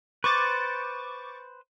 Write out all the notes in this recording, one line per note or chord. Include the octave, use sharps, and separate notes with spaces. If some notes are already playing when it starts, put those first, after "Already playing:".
B4 C5 C#6 D6 A6